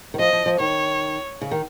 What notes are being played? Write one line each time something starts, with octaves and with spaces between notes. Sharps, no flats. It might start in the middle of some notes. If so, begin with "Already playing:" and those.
D#3
F3 D#5
F3
F3
D#3 C#5
C#3
D#3